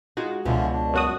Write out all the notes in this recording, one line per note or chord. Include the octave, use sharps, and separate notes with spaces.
G#3 D#4 F4 F#4
C#2 B2 D3 E3 F3
D4
F#2 F#4 D#6